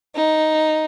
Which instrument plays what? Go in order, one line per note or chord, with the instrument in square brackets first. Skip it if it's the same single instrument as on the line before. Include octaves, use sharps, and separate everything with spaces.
[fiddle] D#4